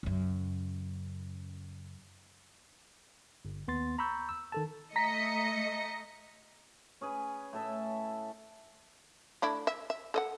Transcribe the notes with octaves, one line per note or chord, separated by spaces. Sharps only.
F#2 C#3
G1
D#2 B3 C6 A6
A#5 B5 C#6 E6 G6
E6
D#3 A4 A5
A3 D#5 A#5 A#6 B6 C#7
C#4 G#4 B4
A2 A4 E5
A3 D4 E4
E5
E5
A4 D#5 F#5